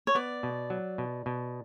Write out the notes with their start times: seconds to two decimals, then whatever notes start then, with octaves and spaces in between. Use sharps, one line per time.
0.07 C#5
0.15 B3 D5
0.43 B2
0.70 F#3
0.98 B2
1.26 B2